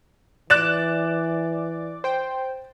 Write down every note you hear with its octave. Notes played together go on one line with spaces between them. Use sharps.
E3 D5 D6 F#6 A6 E7
C5 G5